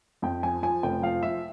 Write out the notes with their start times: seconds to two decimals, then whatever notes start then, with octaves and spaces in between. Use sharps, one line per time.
0.22 F2 G5
0.43 F3 G#5
0.63 F3 G#5
0.83 F1 G5
1.02 F3 F5
1.23 F3 E5